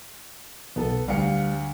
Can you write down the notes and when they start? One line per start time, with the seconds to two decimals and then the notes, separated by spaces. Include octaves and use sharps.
0.76 B1 B3 A4
1.08 D2 G3 F5 C#7